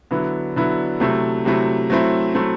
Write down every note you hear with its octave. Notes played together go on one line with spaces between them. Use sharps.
D3 F#3 B3 E4
D3 F#3 B3 E4
C3 F#3 A3 E4
C3 F#3 A3 E4
F#3 A3 C4 E4
F#3 A3 C4 E4